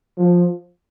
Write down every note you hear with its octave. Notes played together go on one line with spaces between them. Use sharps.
F3